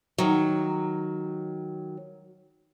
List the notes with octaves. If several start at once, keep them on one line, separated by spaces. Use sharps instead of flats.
D#3 F#3